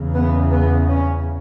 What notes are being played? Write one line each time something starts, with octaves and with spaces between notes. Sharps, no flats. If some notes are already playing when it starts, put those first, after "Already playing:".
Already playing: E2 C#3
B3
B3
C#4